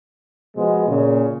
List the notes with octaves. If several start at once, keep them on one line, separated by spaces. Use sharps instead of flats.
B2 F3 G#3 B3
A#2 C#3